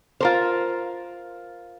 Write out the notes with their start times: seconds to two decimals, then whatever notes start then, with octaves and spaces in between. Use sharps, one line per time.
0.20 F4 A#4 C5